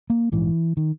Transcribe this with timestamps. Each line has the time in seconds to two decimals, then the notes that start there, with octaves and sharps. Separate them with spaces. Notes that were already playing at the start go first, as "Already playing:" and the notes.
0.10 A#3
0.32 A#1 G#2 E3
0.77 D#3